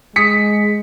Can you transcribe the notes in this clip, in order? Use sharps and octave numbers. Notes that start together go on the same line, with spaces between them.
G#3 D#6 B6 C#7